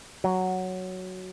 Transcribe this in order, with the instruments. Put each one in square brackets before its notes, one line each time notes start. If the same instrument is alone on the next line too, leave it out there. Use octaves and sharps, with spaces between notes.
[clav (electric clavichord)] F#3